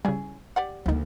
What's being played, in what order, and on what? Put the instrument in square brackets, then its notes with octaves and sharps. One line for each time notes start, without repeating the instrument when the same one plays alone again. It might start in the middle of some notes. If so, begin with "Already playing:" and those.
[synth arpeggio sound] C#3 G3 [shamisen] C#4 E4 G#4
[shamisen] G4 D5 F#5
[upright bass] D2 A#3 [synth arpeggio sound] F3 D#4